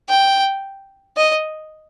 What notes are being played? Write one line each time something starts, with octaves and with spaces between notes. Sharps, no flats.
G5
D#5